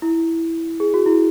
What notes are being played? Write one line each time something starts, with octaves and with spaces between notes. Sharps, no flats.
E4
G#4
F#4
E4